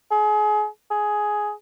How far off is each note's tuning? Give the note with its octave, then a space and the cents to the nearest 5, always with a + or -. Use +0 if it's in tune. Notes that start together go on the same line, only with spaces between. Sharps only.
G#4 +30
G#4 +10